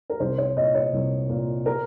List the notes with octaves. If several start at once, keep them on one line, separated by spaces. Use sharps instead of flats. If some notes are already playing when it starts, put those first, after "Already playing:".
A#4
C2 C5
C#5
A#2 D#5
C#5
C2
A#2
A#4